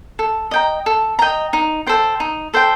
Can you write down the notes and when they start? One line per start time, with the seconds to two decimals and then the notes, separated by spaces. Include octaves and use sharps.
0.19 A4
0.51 D#5 G5 A#5
0.86 A4
1.19 D#5 G5 A#5
1.53 D#4
1.87 A4 C5 G5
2.20 D#4
2.54 A4 C5 G5